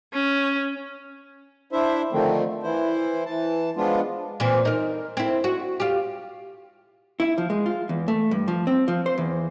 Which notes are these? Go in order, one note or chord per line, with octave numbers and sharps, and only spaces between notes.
C#4
D4 E4 C5 E5
D3 D#3 F3 A3 C4
E3 E4 C5
E3 A5
F3 G#3 B3 D4 F4
A#2 E3 C4
D#4 A#4
C4 E4
F#4
F4 G4
E4
F3
G#3
F4
E2
A3
G2
F3
C4
F3
C5
E2